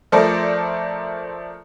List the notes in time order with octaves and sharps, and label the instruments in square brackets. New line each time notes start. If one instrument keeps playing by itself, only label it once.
[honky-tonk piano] F3 A3 A4 A#4 C5 D5